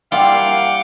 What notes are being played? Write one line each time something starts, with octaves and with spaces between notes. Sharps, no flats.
G3 A#3 E4 F4 F5 F#5 D6 G6